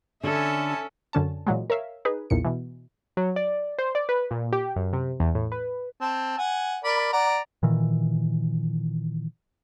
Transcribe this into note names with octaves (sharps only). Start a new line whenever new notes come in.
D3 C#4 A4 E5 G#5 A5
F#2 D3 C#4 A5
A#2 E3 F#3 G#3
A#4 C#5 E5 F5
D#4 G#4 B4
B1 E2 A#2 C#7
B2 E3
F#3
D5
C5
D5
B4
A#2
G4
F#2
C3
E2
A2
B4
C4 A5
F#5 G#5
A#4 D5 B5
D5 F#5 A#5
A#2 D#3 E3